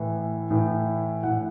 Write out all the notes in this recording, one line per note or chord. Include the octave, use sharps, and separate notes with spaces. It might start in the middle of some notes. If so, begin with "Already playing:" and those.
Already playing: A2 E3
A2 E3
A2 E3 F#5